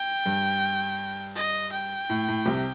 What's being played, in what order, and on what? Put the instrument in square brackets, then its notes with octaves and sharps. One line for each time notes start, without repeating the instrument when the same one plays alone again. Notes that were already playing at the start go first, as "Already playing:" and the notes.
Already playing: [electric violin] G5
[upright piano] G2
[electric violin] D#5
G5
[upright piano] A2
A2
C2 C3